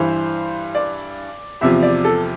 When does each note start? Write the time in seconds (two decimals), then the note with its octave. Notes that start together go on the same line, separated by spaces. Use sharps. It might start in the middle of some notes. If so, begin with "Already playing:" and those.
Already playing: G2 E3 C5
0.75 D5
1.61 E2 C3 F3 E5
1.83 D5
2.04 A4